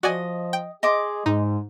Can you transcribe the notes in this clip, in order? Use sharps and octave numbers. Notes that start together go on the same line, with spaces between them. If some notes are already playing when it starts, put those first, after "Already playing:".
F3 F#4 D5 D#5 G#5
G5
G#4 D#5 C6 D6
G#2 G#3 D#4